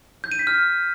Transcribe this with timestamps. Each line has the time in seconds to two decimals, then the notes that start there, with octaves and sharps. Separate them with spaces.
0.24 G6
0.32 D#7
0.39 B6
0.47 F6